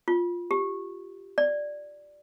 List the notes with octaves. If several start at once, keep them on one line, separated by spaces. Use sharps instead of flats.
F4
G4
D5